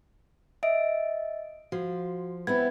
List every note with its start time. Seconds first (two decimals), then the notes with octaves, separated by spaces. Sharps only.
0.63 D#5 E5 D7
1.72 F3 F#4
2.47 B3 C4 E4 G#6